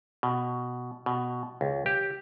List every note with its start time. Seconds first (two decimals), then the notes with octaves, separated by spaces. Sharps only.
0.23 B2
1.06 B2
1.61 C#2
1.86 G4